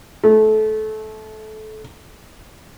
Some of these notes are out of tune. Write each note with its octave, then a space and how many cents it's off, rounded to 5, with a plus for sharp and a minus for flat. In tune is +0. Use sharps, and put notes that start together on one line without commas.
A3 -25